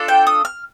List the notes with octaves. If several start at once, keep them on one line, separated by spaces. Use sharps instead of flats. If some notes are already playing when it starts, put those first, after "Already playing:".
Already playing: D4 F4 A4
G5
D#6
F6